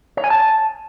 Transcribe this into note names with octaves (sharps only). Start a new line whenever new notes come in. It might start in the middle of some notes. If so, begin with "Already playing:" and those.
C#5
G#5
A5